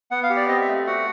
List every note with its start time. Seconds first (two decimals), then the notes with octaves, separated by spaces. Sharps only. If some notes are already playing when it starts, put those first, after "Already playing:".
0.11 B3 F#5
0.23 F5
0.30 G4
0.36 D5
0.48 C4 D#5
0.61 E5
0.68 A3
0.87 F#4 F#5